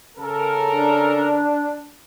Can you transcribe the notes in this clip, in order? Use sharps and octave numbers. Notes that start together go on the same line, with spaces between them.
C#3 A4 A#4
D4